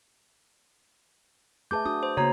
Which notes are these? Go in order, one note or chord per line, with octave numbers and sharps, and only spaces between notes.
A3 G#4 B4 E5 A5 D6 G6
D4 F#4 D#6
C5
C#3 A#3 F#4 C5 C#5 A#5